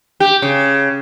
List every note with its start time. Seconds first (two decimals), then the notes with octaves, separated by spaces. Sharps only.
0.20 G4
0.42 C#3